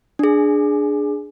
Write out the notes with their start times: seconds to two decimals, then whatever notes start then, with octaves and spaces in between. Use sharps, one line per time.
0.19 D4 G#4